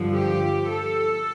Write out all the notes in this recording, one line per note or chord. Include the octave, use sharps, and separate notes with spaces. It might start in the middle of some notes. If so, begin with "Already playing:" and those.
Already playing: G2 D3 F3
G4
A4